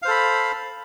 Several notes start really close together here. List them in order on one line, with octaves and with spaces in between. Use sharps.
F5 C5 A4 B5